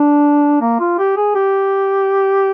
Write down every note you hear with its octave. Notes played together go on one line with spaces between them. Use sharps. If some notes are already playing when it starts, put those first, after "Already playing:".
Already playing: D4
A#3
F4
G4
G#4
G4